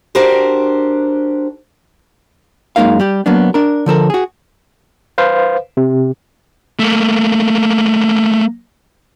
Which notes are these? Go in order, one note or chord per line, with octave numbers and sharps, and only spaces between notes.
D4 F#4 G4 A#4 C5
F#2 G#3 A#3 D#4 A#4 F5
G3 G4
F#3 A#3 B3 D4
D4 A#4
D3 F3 A4 A#4
F#4 G#4
B4 C5 F5
C3
A3 A#3